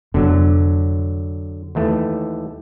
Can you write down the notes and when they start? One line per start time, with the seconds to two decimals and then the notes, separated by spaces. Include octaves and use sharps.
0.14 F1 D3 F#3 B3 D4
1.75 D#2 E3 A3